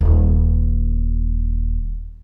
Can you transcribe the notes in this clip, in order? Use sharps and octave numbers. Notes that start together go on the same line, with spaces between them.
D#1 F4